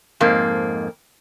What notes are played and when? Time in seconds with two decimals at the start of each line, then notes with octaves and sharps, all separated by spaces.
0.20 F2 G#2 A#3